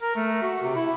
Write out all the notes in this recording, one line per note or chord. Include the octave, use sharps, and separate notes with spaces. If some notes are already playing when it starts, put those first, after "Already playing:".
A#4
A3
F#4
C3
E4